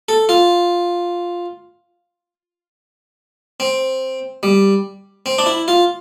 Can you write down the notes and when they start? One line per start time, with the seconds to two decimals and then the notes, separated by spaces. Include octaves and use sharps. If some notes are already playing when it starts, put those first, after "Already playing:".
0.09 A4
0.29 F4
3.60 C4
4.43 G3
5.26 C4
5.38 D4
5.46 E4
5.68 F4